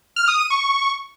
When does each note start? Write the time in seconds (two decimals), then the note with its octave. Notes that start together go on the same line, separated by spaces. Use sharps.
0.16 F6
0.28 D#6
0.39 D#7
0.50 C#6